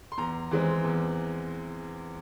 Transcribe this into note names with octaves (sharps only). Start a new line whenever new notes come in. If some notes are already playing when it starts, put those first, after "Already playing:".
C6
E2 A#5
E3 G#3 C4
E2